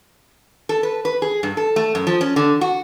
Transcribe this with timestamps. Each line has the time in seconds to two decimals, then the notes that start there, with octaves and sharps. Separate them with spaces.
0.69 A4
0.83 B4
1.05 B4
1.22 G#4
1.43 G2
1.57 A4
1.76 A3
1.95 F#2
2.07 F3
2.21 C#4
2.36 D3
2.61 F#4